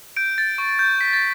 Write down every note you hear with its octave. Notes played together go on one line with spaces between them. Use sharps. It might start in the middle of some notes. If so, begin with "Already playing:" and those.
G6 D7
A6
C#6
G6
G6 B6
A6